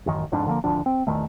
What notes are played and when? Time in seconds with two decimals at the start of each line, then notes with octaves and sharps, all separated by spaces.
0.06 A1 F#2 D#3
0.32 G1 F2 G#2 D4
0.46 D3 F3 A3 A#3
0.64 G#1 D2 F3 D4
0.86 C4
1.07 A#1 E2 D#3 A3